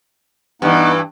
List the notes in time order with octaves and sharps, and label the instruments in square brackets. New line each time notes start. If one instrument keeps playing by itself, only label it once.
[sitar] G2 E3 [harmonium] B3 D#4 F#5